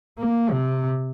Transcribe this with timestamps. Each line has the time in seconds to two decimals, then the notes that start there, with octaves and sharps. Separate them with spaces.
0.18 A#3
0.51 C3